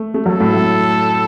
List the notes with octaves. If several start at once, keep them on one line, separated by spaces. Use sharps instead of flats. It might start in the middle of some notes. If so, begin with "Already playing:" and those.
Already playing: A3
A3
F#3 A4
A2
A2